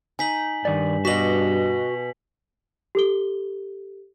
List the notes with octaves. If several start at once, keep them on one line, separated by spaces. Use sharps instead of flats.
D#4 G#5 B6 F#7
G2 D#3 D5
B2 F#4 D5 D#5 C6 B6 F#7
G4 A4 G7